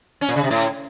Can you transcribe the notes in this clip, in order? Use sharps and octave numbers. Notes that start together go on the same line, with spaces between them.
C#4
A#2
C#3
C3
A2